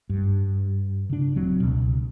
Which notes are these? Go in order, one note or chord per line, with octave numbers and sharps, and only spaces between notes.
G2
C#3 D4
D#1 F#3 C4 D4
C#2 B2